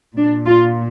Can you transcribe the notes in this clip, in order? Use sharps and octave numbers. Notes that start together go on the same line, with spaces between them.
A#2 D4
F4